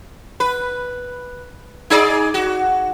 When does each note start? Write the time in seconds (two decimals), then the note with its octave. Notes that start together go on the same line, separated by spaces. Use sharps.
0.40 B4
1.90 D#4 G#4 D5
2.34 F#4